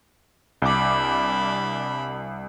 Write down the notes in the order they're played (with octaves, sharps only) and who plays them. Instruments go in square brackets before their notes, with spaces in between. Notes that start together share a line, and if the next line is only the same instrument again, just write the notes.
[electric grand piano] C2 D6 [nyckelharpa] D4 B5